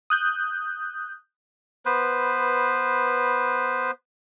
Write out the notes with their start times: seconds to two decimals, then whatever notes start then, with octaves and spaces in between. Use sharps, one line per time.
0.10 D#6 F#6 G6
1.85 B3 B4 C5